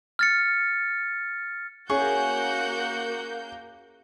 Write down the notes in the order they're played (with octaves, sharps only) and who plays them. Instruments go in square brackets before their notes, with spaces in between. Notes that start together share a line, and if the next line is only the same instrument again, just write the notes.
[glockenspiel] F6 A6 C#7
[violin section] A#3 G6 [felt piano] C#4 [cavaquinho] E4 G#4 C#6 [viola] F#4 F#5